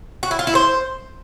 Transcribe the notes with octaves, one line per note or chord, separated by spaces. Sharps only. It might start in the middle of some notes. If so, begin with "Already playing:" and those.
F#4
E4
F4
E4
C5